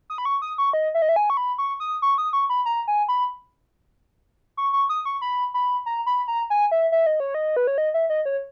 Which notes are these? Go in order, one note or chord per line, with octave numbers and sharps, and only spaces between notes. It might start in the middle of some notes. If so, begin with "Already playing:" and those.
D#6
B5
C#6
D#6
C#6
D#5
E5
D#5
E5
G#5
C#6
B5
C#6
D#6
C#6
D#6
C#6
B5
A#5
G#5
B5
C#6
C#6
D#6
C#6
B5
B5
A#5
B5
A#5
G#5
E5
E5
D#5
C#5
D#5
B4
C#5
D#5
E5
D#5
C#5